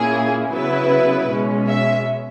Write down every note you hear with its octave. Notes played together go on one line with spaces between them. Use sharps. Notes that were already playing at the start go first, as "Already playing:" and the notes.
Already playing: A#2 A#3 C#4 E4 G#4
C#3 F#3 B3 E4 B4
B2 G#3 C#4
E5